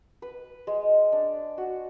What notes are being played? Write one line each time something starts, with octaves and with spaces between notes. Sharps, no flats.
B4
G#3
D4
F#4